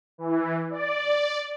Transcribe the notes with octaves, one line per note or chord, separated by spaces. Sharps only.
E3
D5